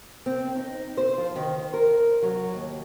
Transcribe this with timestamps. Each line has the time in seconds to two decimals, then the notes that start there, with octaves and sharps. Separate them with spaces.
0.26 C4
0.56 D#4
0.97 C5
1.18 F3
1.36 D#3
1.58 C5
1.74 A#4
2.22 F#3
2.54 D#2